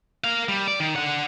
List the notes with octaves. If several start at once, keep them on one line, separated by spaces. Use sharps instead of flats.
A#4 F5
G3
D5
D#3
D4 F#5